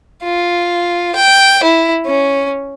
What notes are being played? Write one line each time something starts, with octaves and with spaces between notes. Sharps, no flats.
F4
G5
E4
C#4